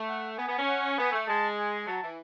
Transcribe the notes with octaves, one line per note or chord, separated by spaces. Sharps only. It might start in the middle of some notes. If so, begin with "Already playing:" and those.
Already playing: A3
F#5
B3 G#5
B3
C#4
F#5
B3 G#5
A3
G#3 A5
G#5
F#3 A5
E3